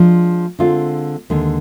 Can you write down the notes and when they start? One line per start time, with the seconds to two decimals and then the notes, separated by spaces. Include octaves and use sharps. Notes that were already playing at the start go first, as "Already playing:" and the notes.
Already playing: F3 G#3 D4
0.59 D3 G#3 C4 F4
1.30 D#2 D3 G#3